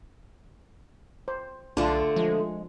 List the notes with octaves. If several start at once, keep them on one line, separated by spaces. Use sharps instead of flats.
C5
B1 D3 A3 D4 F4
F3 G#3